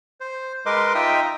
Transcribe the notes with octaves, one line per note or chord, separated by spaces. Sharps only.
C5
G#3 A#4 B4 D#5 C6 D6
D#4 F4 D#5 E5 G5 D#6